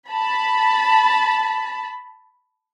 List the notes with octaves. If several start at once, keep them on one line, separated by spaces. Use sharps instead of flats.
A5 B5